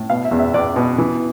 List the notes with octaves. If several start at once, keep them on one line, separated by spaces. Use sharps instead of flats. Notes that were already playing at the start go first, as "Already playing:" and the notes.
Already playing: A2
B2 F5
E5
E2
E5
E2 D5
B2
E3